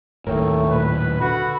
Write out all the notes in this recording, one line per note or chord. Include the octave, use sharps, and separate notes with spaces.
D#2 A2 A3 A#4 C#5 G5
A#2 B4
D3 F#4 B5